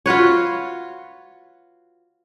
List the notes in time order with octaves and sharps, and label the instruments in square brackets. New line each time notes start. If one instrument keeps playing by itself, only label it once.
[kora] F4 F#4 B4 C#5